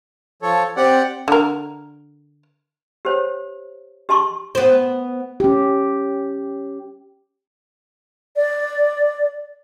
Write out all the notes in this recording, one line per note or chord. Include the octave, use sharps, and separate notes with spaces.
F3 A4 C#5
C4 G4 D5 F#5
D3 A#4
G4 C5 C#5
G4 D#5 A5 C6 C#6
B3 C5
C#4 G4
D5